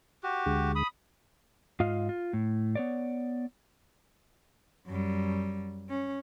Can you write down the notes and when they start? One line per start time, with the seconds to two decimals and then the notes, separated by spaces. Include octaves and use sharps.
0.23 F#4 G4
0.46 D2 D3 G#3
0.76 B5 D#6
1.80 G#2 F4 D#5 F5
2.09 F4
2.33 A2
2.76 B3 C#5 D5
4.87 F#2 G3
5.89 C#4